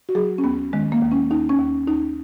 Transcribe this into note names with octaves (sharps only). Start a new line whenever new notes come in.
F#4
F#3 G#4
C#4
D#2 B3
D#3 G#3
A#3
D#2
C#4
D#2 D#4
C#4
D#2
D#2 D#4